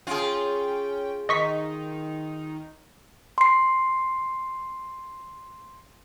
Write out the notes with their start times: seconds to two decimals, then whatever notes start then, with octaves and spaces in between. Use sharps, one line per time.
0.07 C#4 F4 G#4 G5
1.29 D#3 D#4 D#5 C#6 B6
3.38 C6 C7